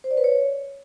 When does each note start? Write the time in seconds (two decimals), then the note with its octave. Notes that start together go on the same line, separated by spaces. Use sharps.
0.04 C5
0.11 D5
0.17 B4
0.24 C#5